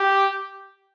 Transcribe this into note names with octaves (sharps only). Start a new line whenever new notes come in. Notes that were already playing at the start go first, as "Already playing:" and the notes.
Already playing: G4